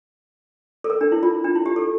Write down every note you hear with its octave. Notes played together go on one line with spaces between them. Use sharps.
A4
A#4
D4
E4
F4
D4
E4
G4
A4